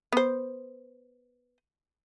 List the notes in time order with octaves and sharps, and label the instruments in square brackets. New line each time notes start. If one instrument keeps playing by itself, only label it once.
[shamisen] B3 C5